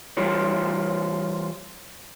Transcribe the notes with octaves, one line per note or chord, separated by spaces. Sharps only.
E3 G3 F4 A#4 C#5